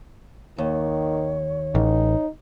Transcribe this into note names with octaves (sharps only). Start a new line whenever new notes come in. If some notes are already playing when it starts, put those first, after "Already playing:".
D#2 D#3 C#5
A1 D#4